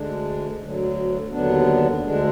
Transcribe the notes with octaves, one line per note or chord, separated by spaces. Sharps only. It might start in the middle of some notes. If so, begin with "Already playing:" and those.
Already playing: D2 D3 G#3 D4
D2 D3 F#3
D#2 D3 F#3 B3 D4
D2 D3 G#3 D4